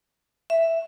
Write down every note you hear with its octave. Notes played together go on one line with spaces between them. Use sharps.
E5